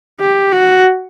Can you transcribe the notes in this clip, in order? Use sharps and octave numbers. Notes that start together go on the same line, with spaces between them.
G4
F#4